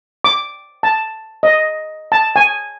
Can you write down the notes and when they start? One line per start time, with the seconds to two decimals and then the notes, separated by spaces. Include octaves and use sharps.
0.24 D6
0.83 A5
1.43 D#5
2.12 A5
2.36 G#5